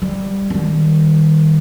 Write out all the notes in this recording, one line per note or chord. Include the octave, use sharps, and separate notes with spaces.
G3
D#3 G3